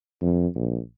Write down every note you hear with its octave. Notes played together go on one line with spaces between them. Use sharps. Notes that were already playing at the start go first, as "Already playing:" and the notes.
F2
A#1